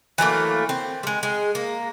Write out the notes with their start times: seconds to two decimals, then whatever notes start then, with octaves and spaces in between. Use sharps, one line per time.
0.18 E3 F#3 A3 A#3
0.69 C4
1.03 G3 G#3
1.23 G#3
1.55 A#3